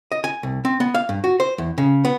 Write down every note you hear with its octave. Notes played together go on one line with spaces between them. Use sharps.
D#5
G#5
C2
C4
B3
F5
G2
F#4
C5
E2
C#3
B3